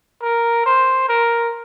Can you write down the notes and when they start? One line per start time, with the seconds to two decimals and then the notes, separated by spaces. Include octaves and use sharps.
0.22 A#4
0.66 C5
1.09 A#4